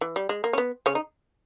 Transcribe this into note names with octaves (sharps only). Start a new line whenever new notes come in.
E3
G3
G#3
A#3
C#4
B3
C#3 C#4
D#4